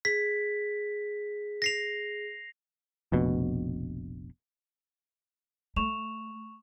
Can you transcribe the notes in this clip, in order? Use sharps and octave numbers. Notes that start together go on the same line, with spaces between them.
G#4 B6
A#6 C7 F7
F1 A#1 B2
A3 C#6 E7 F7